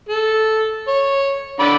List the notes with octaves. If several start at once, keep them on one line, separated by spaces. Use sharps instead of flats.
A4
C#5
D3 D5 B5